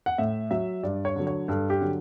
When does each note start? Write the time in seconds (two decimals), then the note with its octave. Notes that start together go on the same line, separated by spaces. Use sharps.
0.06 F#5
0.18 A2 E5
0.51 F#3 E5
0.83 G2 D5
1.05 C#5
1.16 D3 F#3
1.27 C#5
1.48 G2 A4
1.70 G4
1.81 D3 F#3